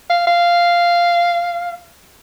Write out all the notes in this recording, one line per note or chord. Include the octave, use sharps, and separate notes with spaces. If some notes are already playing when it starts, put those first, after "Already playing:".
F5
F5